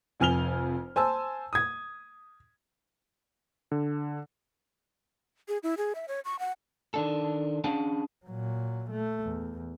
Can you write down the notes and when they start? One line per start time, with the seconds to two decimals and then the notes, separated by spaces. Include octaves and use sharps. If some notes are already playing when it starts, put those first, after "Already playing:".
0.20 F1 F2 G#5 F6 F7 G7
0.96 C5 G#5 A5 E6
1.53 D#6 G#6
3.71 D3
5.48 G#4
5.63 E4
5.77 G#4
5.95 E5
6.08 C#5
6.25 C#6
6.39 F#5
6.94 D#3 D4 A4
7.64 C#4 D4 G#4 F5 F#5 A5
8.26 A#2 F#3
8.90 A3
9.24 E2